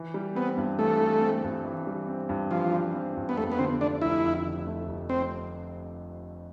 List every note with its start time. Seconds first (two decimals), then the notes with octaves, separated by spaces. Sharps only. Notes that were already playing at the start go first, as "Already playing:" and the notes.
Already playing: E3
0.14 G3
0.35 B3 C4
0.57 G2
0.79 E3 A3
1.01 G3
1.21 C4
1.44 G2
1.65 E3
1.87 G3
2.08 C4
2.29 G2
2.51 E3 F3
2.73 G3
2.94 C4
3.16 G2
3.29 B3
3.37 F2 A3
3.52 B3
3.58 D3 C4
3.81 A3 D4
4.02 F1 E4
4.24 F2
4.45 D3
4.67 A3
4.88 F1
5.09 C4